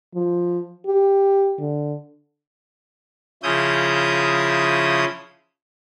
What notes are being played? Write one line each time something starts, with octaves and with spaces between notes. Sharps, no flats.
F3
G4
D3
C#3 F3 C#4 E4 D#6 G6